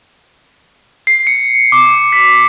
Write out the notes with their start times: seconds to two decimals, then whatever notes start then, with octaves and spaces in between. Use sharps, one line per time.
1.07 C7
1.27 C#7
1.72 D6
2.12 B6